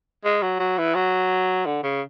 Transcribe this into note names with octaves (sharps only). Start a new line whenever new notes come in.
G#3
F#3
F#3
E3
F#3
D3
C#3